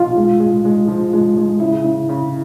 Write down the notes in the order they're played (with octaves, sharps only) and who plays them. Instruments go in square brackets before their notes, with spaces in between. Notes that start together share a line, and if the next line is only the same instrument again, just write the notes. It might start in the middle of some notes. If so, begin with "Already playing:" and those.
Already playing: [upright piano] B1 [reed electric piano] F4
[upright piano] G#3
G#3
G#3
F3
G#3
G#3
[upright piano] C#3 [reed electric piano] E4
[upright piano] C#3
C#3